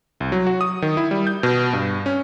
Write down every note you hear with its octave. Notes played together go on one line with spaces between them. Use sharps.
C2
F#3
F#4
D#6
D#3
E4
G3
G6
B2
G2
C#4